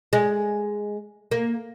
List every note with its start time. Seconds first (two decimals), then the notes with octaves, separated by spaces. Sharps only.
0.13 G#3
1.31 A#3